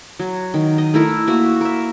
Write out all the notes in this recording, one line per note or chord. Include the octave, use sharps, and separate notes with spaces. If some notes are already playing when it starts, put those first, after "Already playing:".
F#3
D#3
D#5
A3 E4 A#4
A#3 F#4 E5
A#4 E5